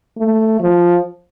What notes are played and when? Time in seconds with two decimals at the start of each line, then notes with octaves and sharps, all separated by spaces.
0.17 A3
0.60 F3